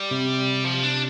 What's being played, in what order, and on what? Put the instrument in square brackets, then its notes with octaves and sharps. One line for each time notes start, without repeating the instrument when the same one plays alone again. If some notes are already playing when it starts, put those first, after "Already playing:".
Already playing: [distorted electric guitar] G3
[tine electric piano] C3
[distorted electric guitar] F3
D4